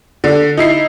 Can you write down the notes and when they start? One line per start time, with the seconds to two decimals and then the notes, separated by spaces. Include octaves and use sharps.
0.24 D3
0.57 D#4 E4 C7